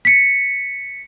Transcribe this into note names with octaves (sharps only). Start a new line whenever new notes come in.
B6 C#7